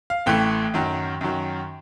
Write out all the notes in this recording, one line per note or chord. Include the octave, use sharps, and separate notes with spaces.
F5
A1 A2 E3 A3 G5
F#2 D#3 F#3
F#2 D#3 F#3